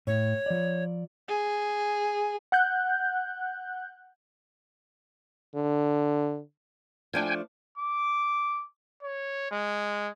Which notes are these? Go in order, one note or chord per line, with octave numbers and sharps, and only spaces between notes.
A2 C#5
F3 D5
G#4
F#5 F#6 G6
D3
F3 A3 D4 G5 G#5
D6
C#5
G#3